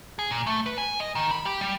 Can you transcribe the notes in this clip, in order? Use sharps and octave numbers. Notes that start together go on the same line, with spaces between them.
G#4
A#2
A3
B4
G#5
D#5
D#3
B5
G4
G3